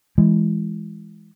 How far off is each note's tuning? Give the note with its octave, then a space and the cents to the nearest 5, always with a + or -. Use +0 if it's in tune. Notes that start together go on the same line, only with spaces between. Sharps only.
E3 +0 G#3 +0